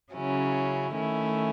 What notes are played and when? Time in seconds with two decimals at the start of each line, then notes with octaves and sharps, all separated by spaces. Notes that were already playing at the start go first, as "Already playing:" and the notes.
0.13 C#3 F#3 C#4 E4
0.93 D#3 A3 C#4 E4